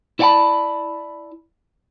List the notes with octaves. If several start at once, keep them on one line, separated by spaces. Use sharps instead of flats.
E4 C#5 D5 F#5 A5 B5